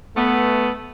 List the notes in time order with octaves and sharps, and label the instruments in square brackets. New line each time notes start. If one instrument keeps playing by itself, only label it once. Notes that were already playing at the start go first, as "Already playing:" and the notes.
[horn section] A3 B3